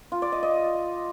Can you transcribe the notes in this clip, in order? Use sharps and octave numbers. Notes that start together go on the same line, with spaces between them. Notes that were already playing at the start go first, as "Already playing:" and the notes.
F4
D5
D#5
D#5